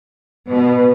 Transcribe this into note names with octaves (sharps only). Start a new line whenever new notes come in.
B2 B4